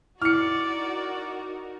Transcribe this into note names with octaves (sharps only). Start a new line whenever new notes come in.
D#4 E4 F#4 A#4 D5 F6 C#7